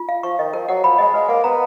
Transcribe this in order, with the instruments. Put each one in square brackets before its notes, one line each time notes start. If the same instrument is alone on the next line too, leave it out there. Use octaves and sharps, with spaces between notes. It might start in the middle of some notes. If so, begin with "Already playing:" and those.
Already playing: [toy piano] F4
F5
[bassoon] F3 [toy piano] C#6
[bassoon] D#3 [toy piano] D#5
[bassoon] F3 [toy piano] A#4
[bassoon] F#3 [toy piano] F#5
[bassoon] F3 [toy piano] B5
[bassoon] G#3 [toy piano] D#5
[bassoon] G#3 [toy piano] B4
[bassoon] A#3 [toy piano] F#5
[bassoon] B3 [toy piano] A#5